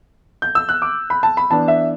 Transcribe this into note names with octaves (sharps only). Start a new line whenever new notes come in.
G6
E6
F#6
D6
B5
A5
B5
E3 B3 D4 A5
E5